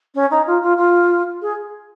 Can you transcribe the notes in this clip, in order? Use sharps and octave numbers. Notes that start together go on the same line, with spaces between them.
C#4
D#4
F4
F4
F4
G#4